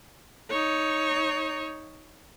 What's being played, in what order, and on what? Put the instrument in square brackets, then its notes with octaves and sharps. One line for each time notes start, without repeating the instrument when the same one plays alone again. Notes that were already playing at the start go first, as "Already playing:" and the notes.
[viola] D#4 C#5